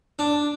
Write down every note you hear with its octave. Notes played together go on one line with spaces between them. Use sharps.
D4